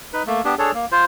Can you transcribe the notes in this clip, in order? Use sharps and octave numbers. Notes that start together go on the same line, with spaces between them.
D#4 B4
A3 A#3
B3 D4 G4
D4 G#4 A4 C#5
A#3
F4 C5